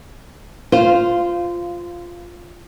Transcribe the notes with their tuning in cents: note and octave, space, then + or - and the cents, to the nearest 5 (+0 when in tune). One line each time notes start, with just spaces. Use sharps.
F4 +0 C5 -20 F5 -10